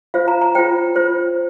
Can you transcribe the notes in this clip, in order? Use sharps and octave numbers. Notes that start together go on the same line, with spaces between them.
F4 C5 F5
A#5
A#5
F4 C5 G5
F4 C5